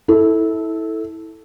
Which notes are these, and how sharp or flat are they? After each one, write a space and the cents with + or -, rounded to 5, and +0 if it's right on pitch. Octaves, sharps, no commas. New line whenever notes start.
E4 -20 A4 +0